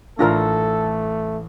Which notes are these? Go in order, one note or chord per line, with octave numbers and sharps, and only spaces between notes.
A1 A3 D4 F4 A4 A#4 A#6